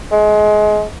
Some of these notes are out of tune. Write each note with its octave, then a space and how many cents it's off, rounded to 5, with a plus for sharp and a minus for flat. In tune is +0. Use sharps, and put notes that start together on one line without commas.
G#3 +25